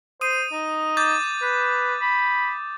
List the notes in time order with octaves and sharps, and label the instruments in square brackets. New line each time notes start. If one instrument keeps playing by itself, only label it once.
[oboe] C5 [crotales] D#6 D#7
[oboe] D#4
[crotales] D6 G6 A6
[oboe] B4
B5